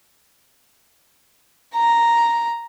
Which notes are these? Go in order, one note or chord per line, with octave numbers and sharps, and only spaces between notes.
A#5